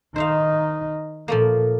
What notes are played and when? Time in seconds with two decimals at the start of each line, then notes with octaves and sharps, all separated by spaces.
0.16 D#3 D#4 C5 E5 F5
1.28 A#2 F3 A3 A#3